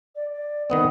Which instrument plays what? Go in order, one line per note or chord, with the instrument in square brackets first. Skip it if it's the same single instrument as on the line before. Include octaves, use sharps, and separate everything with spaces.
[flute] D5
D5
[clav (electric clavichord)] D#3 B3 C4 [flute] D#6